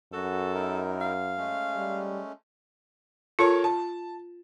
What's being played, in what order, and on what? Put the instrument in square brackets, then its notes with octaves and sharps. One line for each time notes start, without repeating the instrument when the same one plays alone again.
[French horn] F#2 [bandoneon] F#4 [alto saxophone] A4
[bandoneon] D#4 E4 A#4
[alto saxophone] F5
[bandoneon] G#3 A3 C#4
[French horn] G3
[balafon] F4 [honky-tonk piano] A4 A#4 C#5
[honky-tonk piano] A5